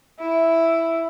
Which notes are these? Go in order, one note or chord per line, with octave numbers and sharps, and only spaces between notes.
E4